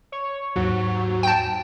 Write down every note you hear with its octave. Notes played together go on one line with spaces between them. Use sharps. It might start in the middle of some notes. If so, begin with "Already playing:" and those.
C#5
D#2 G#2 F#3 F#4
G5 A5